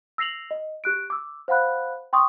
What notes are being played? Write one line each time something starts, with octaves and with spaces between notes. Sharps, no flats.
E6 A#6 C7 F7 F#7
D#5
G4 F#6 D7
D6 E6
C5 F5 F#5 B5 F#6
G5 C6 C#6 D#6